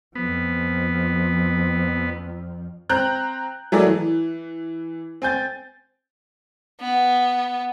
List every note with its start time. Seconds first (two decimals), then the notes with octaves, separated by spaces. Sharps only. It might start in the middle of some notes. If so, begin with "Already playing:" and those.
0.15 F2 F3 B3
2.89 C4 A#5 F#6 G6
3.72 F#3 A3 E4 G#4 A#4 D5
3.87 E3
5.22 C4 G#5 G6 A6
6.80 B3